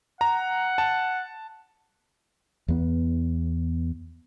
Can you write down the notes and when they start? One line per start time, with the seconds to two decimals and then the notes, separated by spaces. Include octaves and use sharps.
0.21 F#5 A#5
0.78 A5
2.68 E2 B3